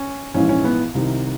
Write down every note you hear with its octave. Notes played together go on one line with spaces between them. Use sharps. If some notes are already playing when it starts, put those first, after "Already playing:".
Already playing: C#4
A#1 G#2 E3 C#4
C#4
B3
C2 C3 D#3